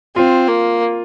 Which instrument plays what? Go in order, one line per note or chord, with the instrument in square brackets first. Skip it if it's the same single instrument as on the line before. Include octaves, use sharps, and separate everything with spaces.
[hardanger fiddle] C4 [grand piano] F4
[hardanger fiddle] A#3